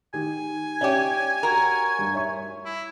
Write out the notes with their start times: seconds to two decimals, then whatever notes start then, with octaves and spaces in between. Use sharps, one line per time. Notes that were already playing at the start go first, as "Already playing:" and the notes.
0.14 D#3 G4 G#5
0.81 C#4 G4 C#5 D5 E5
1.43 F#4 A#4
1.99 G2
2.14 C#5 E5 C#6
2.66 E4